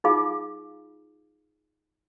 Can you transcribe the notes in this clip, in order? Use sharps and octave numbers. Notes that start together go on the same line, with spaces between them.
D#4 F4 G#4 F5 D6